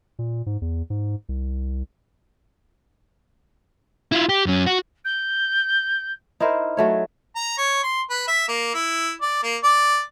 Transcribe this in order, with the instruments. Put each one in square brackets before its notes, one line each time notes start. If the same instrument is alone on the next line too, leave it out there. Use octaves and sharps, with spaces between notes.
[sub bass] A#2
G#2
E2
G#2
C2
[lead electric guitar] E4 F4
G4
F#2 C#4
F#4
[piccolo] G6
[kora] D#4 E4 A#4 C5
F#3 A3 C#5
[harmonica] A#5
C#5
C6
B4
E5
A#3
E4
D5
A#3
D5